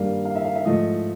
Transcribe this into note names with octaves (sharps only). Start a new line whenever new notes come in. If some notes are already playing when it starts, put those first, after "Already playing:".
Already playing: G2 D#3 G3 A#3 F5
F5
E5
F5
E5
G#2 F3 A3 D#5